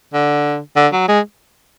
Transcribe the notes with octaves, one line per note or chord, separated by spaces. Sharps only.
D3
D3
F#3
G#3